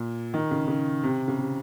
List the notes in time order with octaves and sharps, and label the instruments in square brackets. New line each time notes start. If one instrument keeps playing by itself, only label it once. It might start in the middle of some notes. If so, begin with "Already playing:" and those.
Already playing: [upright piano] A#2
D#3
C#3
C#3
C3
C#3
C3